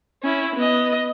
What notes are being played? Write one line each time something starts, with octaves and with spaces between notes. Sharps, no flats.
C#4 E4
B3 D#5